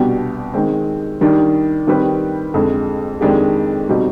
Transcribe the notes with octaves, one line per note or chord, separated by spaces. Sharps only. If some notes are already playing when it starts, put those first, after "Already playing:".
Already playing: C2 B2 B3 D4 G4
D#3 G#3 C4
D#3 G3 D4
D#3 G3 C4 G4 B4
F2 D3 G#3
F2 D#3 G#3 D4 G4
B2 G3 C4 D#4